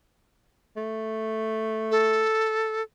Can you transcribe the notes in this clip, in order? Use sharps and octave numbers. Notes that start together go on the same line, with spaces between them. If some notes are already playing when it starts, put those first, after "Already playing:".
A3
A4